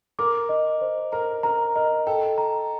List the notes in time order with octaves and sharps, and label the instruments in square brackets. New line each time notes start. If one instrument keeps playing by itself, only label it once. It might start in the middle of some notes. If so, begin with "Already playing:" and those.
[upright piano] A#4 [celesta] D6
[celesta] D#5
C5
[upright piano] A#4 [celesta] A#5
[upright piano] A#4 [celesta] A#5
[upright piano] A#4 [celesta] D#5
[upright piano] A4 [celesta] G5
[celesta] A#5